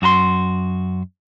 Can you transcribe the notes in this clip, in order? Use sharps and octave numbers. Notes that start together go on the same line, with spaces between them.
F#2 F#4 A#5 C6